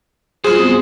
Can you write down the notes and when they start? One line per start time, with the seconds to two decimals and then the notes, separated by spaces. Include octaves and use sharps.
0.44 G2 F4 F#4 G#4 C5
0.58 B3 C4